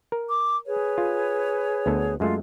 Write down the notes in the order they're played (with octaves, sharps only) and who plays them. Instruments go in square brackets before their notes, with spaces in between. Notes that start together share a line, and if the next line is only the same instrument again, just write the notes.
[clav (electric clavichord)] A#4
[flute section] D6
G#4 B4 C#5
[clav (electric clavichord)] F4
D2 B3 A4
[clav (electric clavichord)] F#2 G#3 A3 [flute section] F4 F5